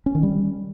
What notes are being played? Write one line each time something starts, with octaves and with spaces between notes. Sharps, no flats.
C#4
D#3
G3